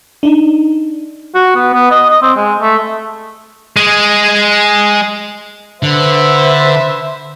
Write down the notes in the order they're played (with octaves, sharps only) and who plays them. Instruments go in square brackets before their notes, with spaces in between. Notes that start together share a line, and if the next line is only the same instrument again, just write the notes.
[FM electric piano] D4 D#4
[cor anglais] F#4
B3
B3
D#5
D#5
C4
G#3
A3
[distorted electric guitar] G#3 G#4
[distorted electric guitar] D3 [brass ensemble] B4 C5 E5